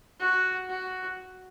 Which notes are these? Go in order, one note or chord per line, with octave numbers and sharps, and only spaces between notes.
F#4
F#4